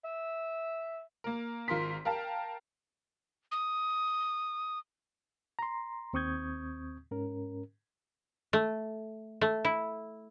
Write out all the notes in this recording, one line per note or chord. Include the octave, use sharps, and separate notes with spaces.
E5
A#3 A#4
G#1 F4 A#4 C6 B6
A#4 F5 G5 A5
D#6
A#5 C6
D#2 C4 C#6 D#6 G6 G#6
G#2 C#4 A#4
A3
A3
E4